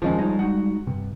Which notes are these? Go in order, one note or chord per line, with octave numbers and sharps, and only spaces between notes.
D#1 D#3 F3 G#3 C#4
G3 D#4 C#5 D#5
G#3 D#4 F#4 F#5
G2 C3